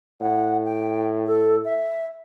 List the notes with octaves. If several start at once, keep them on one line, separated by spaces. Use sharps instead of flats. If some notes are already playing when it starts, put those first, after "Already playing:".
A2 F#5
G5
A4
E5